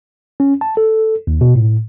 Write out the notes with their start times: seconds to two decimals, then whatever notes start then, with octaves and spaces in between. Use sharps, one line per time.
0.40 C#4
0.61 A5
0.77 A4
1.27 D#2
1.41 B2
1.55 A2